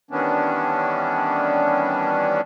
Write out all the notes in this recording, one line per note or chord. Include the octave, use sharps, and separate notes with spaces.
D#3 E3 G3 B3 C#4 D4